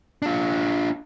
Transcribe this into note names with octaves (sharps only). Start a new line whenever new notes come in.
D4 F4